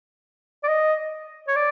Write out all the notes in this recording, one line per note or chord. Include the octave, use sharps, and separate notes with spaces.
D5
D#5
C#5
D5